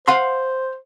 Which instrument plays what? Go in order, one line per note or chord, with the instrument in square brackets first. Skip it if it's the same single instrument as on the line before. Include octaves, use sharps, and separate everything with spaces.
[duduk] C5 [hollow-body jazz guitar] F5 F#5 C6